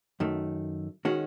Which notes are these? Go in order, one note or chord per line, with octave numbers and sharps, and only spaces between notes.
F#2 D#3 A3
D#3 G#3 C#4 F#4